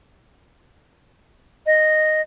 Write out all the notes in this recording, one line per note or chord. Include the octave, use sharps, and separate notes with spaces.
D#5